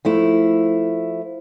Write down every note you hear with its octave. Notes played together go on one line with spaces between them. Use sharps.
F3 A3 E4